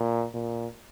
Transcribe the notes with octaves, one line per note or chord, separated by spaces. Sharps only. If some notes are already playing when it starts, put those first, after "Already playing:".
Already playing: A#2
A#2